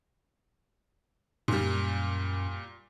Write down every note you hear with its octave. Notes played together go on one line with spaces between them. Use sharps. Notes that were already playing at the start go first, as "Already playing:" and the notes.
F#2 A#2 G3